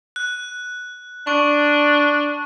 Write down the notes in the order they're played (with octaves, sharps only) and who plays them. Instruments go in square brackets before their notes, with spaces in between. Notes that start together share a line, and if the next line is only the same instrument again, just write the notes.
[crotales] F#6
[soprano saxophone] D4 [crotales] C#6